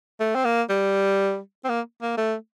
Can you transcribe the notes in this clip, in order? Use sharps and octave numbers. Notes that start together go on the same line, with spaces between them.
A3
C4
A#3
G3
C4
A#3
A#3
A3